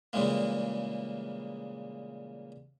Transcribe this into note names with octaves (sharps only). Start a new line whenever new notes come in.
A#2 C#3 E3 G3 G#3 A#3